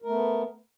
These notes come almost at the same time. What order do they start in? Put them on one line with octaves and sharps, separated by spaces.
A#4 A3 B3